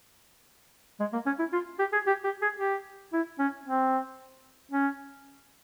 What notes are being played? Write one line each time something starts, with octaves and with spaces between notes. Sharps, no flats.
G#3
A#3
C#4
E4
F4
G4
G#4
G4
G4
G#4
G4
E4
C#4
C4
C#4